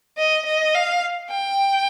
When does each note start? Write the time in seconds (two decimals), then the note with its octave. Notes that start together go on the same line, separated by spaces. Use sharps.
0.18 D#5
0.46 D#5
0.75 F5
1.31 G5